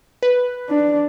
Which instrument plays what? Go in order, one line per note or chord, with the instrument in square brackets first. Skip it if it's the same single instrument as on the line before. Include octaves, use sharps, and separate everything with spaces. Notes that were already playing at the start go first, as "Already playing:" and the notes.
[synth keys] B4
[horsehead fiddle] D4